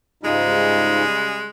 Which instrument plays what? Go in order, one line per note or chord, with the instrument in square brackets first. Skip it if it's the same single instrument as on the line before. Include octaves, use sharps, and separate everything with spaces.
[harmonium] G#2 D#4 F4 [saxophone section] C#3 G3 G#3